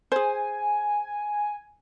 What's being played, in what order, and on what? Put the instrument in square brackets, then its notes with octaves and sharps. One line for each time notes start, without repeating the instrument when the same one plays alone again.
[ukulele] G#4 C5 [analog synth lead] G#5